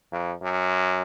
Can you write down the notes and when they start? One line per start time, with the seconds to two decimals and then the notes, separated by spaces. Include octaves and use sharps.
0.12 F2
0.42 F#2